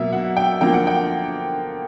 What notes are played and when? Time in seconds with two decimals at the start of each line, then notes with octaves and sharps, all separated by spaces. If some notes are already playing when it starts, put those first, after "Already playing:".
Already playing: B2 F#3 A#3 E5
0.12 F#5
0.37 G5
0.61 D3 F3 A#3 G5
0.73 F#5
0.87 G5